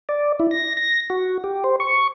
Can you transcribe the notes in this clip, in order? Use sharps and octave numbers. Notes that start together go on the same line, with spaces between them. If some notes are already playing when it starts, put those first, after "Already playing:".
D5
E4
A#6
A#6
F#4
G4
C5
C#6